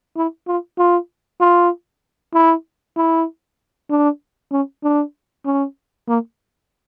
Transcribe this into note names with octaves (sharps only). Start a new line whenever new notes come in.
E4
F4
F4
F4
E4
E4
D4
C#4
D4
C#4
A#3